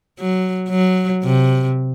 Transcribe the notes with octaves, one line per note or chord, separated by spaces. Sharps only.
F#3
F#3
C3